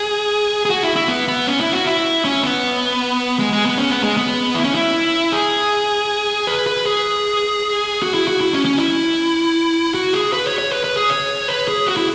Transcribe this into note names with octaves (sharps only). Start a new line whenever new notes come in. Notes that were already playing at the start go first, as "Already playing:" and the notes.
Already playing: G#4
G#4
F#4
E4
E4
B3
B3
C#4
E4
F#4
E4
C#4
B3
G#3
G#3
B3
C#4
B3
G#3
B3
E4
C#4
E4
G#4
B4
B4
G#4
F#4
E4
F#4
E4
C#4
C#4
E4
F#4
G#4
B4
C#5
C#5
B4
B4
G#4
C#5
B4
G#4
F#4
E4